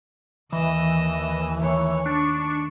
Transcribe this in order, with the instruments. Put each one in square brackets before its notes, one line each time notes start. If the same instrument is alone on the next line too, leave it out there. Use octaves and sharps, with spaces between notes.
[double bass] D#2 [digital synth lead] E3 [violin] D#5 E6
[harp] D#3 A3 [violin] C#5
[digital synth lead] D4 [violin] C#6